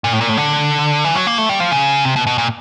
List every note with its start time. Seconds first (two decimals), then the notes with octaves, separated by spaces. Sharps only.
0.04 A#2
0.13 A2
0.21 A#2
0.29 A2
0.37 D3
1.05 E3
1.15 F#3
1.27 A#3
1.38 A3
1.49 G3
1.60 F3
1.72 C#3
2.05 C3
2.16 B2
2.27 B2
2.38 A#2